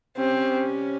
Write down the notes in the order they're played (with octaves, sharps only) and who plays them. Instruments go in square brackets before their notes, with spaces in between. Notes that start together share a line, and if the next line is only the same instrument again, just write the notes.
[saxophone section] C3 G3 C#4 G4 [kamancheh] C4